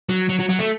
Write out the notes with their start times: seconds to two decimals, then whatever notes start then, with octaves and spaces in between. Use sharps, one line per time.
0.09 F#3
0.29 F#3
0.39 F#3
0.50 F#3
0.59 A3